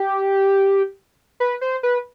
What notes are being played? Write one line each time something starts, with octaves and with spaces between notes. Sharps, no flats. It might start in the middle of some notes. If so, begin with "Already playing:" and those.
Already playing: G4
B4
C5
B4